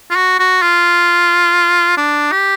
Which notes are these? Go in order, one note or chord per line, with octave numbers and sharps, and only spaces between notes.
F4
F#4
F#4
F4
D4
G4